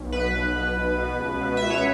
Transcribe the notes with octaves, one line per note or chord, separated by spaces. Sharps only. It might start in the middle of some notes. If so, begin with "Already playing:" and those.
Already playing: B1
B2 B4
B1
B2
B1
B2
C#2
B2
E5
C#2
C#5